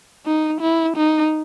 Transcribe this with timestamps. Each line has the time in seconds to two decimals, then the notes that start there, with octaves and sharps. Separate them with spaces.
0.26 D#4
0.61 E4
0.96 D#4